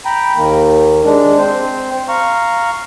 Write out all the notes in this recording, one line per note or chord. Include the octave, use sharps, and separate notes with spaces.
G5 A#5 B5
D#2 D#3 A#3
G#3 D4
C4 C5
F5 A#5 C#6